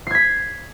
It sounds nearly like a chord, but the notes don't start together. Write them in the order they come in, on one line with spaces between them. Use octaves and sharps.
C7 G#6 B6